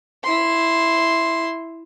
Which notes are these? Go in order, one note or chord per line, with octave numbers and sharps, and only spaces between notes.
E4 C6